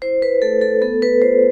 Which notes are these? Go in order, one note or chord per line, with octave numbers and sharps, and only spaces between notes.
E4 C5
B4
A3 A4
A4
B3 A4
B4
F4 C5